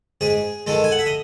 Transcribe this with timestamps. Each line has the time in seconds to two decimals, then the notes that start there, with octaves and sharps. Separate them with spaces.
0.21 G#2 G#4
0.67 D#3 G#3 A4
0.84 G#5
0.91 F#5
0.99 E5
1.06 D#5